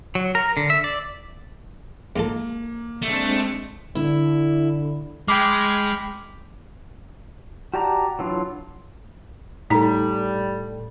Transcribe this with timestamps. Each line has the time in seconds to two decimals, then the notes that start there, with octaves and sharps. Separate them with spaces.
0.15 F#3
0.35 A#4
0.57 D3
0.70 E5
0.84 D5
2.16 G#2 A#3 F4 A4
3.02 G#3 A3 C4 D4
3.95 D3 E4
5.28 G#3 G5 B5 D6 F6
7.74 F#4 G4 D5 A5 A#5
8.19 E3 F#3 D4 F4
9.70 A2 G3 D#4 A4 A#5